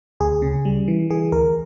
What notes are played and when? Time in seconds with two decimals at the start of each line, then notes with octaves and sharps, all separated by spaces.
0.20 D2 G#4
0.42 C#3
0.65 G3
0.88 E3
1.10 E3 G#4
1.32 D2 A#4